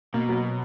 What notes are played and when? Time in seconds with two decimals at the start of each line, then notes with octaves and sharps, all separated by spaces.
0.14 B2 A#3
0.29 F#3